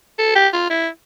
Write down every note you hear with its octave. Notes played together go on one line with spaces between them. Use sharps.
A4
G4
F4
E4